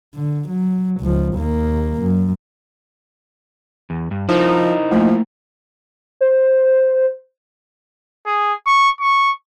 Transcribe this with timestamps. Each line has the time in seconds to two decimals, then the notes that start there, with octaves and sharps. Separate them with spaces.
0.15 D3
0.49 F#3
1.01 C#2 F3
1.35 D#2 A#3
2.02 F#2
3.90 E2
4.11 G2
4.29 F3 D#4 E4 A#4 C5
4.91 F3 A3 A#3
6.21 C5
8.26 G#4
8.67 C#6
9.01 C#6